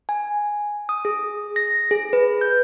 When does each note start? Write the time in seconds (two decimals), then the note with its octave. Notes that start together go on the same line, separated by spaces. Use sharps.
0.09 G#5
0.89 D#6
1.05 G#4
1.56 A#6
1.91 G#4
2.13 B4
2.41 G6